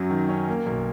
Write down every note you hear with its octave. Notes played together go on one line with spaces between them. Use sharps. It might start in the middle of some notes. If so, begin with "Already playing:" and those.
Already playing: F#2 F#3
D#3
C#4
A#3
B1